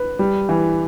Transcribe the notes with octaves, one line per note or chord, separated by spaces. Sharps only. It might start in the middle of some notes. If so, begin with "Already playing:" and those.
Already playing: B4
G3
E3